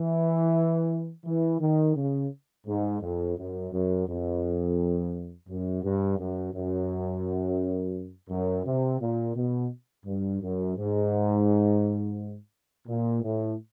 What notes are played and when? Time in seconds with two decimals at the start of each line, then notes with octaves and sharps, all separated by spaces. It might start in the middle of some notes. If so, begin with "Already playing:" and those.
Already playing: E3
1.25 E3
1.61 D#3
1.96 C#3
2.67 G#2
3.01 F2
3.38 F#2
3.72 F#2
4.08 F2
5.49 F#2
5.84 G2
6.19 F#2
6.54 F#2
8.30 F#2
8.66 C3
9.01 A#2
9.36 B2
10.06 G2
10.42 F#2
10.77 G#2
12.88 A#2
13.23 A2